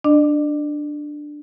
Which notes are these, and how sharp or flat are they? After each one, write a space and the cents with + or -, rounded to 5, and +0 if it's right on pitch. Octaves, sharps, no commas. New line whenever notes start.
D4 +5 D5 +45